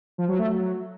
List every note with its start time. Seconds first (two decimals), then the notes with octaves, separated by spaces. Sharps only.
0.18 F3
0.28 F#3
0.39 A3
0.49 F#3